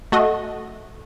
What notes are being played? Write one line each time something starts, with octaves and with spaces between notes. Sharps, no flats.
A3 F#4 D#5